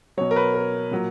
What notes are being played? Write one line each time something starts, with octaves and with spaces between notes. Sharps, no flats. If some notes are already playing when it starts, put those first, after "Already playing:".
B2 F#3 C#5
A#4
B4
A#4
A#2 F#3